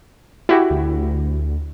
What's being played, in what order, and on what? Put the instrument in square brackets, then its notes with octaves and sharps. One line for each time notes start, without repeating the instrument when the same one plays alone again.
[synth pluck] E4 F#4 G4
[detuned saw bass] D2